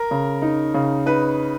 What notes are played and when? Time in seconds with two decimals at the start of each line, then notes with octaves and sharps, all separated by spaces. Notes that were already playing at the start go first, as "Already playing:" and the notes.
Already playing: A#4
0.11 C#3
0.42 D#4
0.74 C#3
1.06 D#4 B4